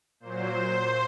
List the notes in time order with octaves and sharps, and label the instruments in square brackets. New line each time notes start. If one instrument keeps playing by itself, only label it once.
[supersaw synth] A#2 F#3 C5